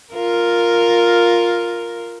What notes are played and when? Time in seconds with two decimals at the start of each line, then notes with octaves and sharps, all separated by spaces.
0.14 F4 A#4